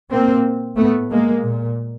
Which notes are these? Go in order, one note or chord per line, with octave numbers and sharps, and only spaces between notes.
A#2 A#3 C4
A2 A3 B3
G#3 A#3
A#2